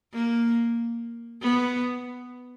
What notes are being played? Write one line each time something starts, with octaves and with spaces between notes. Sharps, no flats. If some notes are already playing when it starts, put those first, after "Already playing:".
A#3
B3